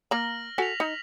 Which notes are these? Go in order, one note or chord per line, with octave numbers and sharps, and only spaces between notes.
A#3 A#5 F6 A#6 F#7
F#4 A4 G#5 B6 F7
D#4